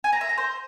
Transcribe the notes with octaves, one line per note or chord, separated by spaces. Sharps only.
G#5
A#5
E5
A#5
C5